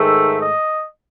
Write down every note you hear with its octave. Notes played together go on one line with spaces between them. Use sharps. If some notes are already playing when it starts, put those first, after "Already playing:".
Already playing: G#2 D#3 A3 E5
D#5